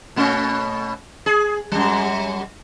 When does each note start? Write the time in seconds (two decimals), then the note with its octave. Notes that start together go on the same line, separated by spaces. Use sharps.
0.16 B2 A3 C#4
1.26 G#4
1.72 F#2 G3